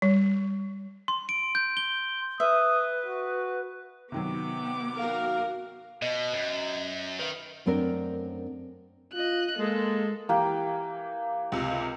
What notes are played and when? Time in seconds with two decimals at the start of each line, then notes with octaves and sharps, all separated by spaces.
0.02 G3
1.08 C6
1.29 D7
1.55 G6
1.77 G7
2.40 B4 E5 D#6
3.06 F#4
4.12 C3 D#3 F#3 B3 D6
4.98 F#4 A#4 F5
6.02 B2 D#5
6.34 F#2
7.19 D#3 B4 E5
7.66 F#2 A3 C4 D4 A#4
9.14 F4 D#5 F#6
9.58 G#3 A#3 A4
10.29 E3 A#3 G4
11.52 C#2 C3